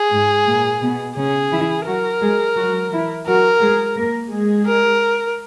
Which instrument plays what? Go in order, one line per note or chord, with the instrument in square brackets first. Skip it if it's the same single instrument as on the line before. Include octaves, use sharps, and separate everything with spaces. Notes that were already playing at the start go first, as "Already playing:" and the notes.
Already playing: [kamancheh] G#4
[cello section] G#2 G#3
A#2 A#3
B2 B3
[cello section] C#3 C#4 [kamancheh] G#4
[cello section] E3 E4
[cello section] F#3 F#4 [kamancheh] A#4
[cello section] G#3 G#4
F#3 F#4
E3 E4
[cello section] F#3 F#4 [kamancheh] A#4
[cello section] G#3 G#4
A#3 A#4
G#3 G#4
[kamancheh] A#4